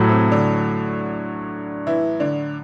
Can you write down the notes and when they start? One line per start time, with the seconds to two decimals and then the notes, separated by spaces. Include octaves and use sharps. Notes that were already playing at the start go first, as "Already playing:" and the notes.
Already playing: A2 F#3 A3
0.09 C3 C4
0.31 D3 D4
1.87 E3 E4
2.20 D3 D4